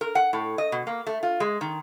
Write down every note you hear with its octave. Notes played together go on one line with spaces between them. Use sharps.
A#4
F#5
A2
D#5
B2
A#3
A3
F4
G#3
D#3